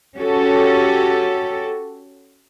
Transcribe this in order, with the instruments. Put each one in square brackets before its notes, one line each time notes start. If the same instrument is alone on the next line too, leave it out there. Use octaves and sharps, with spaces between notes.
[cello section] C#4 F#4 G4 A4